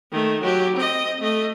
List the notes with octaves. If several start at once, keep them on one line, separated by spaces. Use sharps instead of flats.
D#3 A3
F#3 G4
C4 D#5
A3 D#5